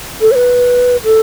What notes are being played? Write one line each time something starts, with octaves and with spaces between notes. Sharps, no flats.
A4
C#5
B4
A4